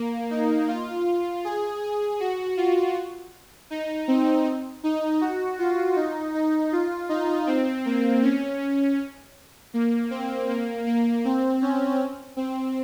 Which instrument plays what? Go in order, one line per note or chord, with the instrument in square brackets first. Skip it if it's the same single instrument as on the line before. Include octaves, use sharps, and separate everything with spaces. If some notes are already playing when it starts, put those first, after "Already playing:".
Already playing: [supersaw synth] A#3
D#4
F4
G#4
G#4
F#4
F4
D#4
C4
D#4
F#4
F4
D#4
D#4
F4
D#4
C4
A#3
C#4
A#3
C4
A#3
A#3
C4
C#4
C4